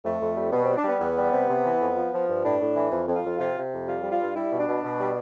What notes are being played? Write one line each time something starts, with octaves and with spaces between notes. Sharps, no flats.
F2 A3
F2
G3
B2 B3
G3 C4
D4
G3 B3
E2 B3
G3
C3
C3
E3
F2
F3
F3
G2
A2 D4
A2
E3
F2
F2
F4
F2
C3 F4
C3
F2
G3 F4
G3
F4
G2
G3 E4
B2
D4
B2
B2
G3